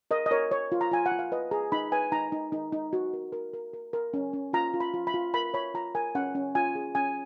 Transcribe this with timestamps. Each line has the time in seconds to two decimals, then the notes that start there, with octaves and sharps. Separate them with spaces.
0.11 A#4 D#5
0.26 D#5
0.31 A#4 C#5
0.51 A#4 C#5
0.72 F4
0.81 A#5
0.91 F4 G#5
1.06 F#5
1.12 F4
1.19 F5
1.32 B4 D#5
1.51 G#4 A#5
1.72 D#4 B5
1.92 B4 G#5
2.12 D#4 A#5
2.32 D#4
2.52 D#4
2.72 D#4
2.93 F#4
3.13 A#4
3.33 A#4
3.53 A#4
3.73 A#4
3.93 A#4
4.14 C#4
4.33 C#4
4.53 F4 A#5
4.74 F4
4.80 B5
4.94 F4
5.07 B5
5.14 F4
5.34 A#4 B5
5.54 C#5 B5
5.74 F4 A#5
5.95 A#4 G#5
6.15 C#4 F#5
6.35 C#4
6.55 F4 G#5
6.75 G#4
6.95 C#4 G#5